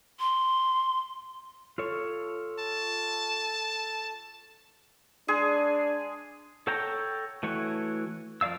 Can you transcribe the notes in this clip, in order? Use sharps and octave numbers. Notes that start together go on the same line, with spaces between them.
C6
F4 A4 C#5
A5
G#3 D4 G#4
A4 C#5 F#5 G5 A#5
E3 A3 F#4 C#5
F3 A#4 D5 F5 E6